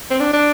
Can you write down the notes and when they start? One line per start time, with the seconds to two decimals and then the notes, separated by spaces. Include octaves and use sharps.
0.10 C4
0.20 D4
0.33 D4